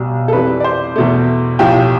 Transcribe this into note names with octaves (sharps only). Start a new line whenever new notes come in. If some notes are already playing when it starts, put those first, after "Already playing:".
Already playing: B1 B2 G3
A4
F2 E3 G3 B4
D5
C5
E2 B2 A3
B1 A2 F3 G4